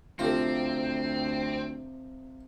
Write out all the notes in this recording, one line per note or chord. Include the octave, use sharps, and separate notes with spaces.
D2 C3 F3 C4 F4 G4 A4 A#5